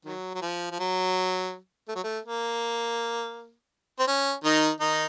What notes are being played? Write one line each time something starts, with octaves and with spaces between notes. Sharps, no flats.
D#3 F#3
F#3
F3
F3
F#3
A3
F#3
A3
A#3
C4
C#4
D#3 D#4
D#3 D#4